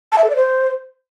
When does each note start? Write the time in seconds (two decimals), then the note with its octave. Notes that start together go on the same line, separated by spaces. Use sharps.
0.12 A5
0.18 E5
0.24 A4
0.30 D5
0.36 C5